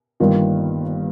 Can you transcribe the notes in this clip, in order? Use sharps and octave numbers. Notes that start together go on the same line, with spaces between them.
G1 G2 D#3 A#3 F4